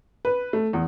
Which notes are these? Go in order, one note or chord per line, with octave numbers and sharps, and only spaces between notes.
B4
A3
E2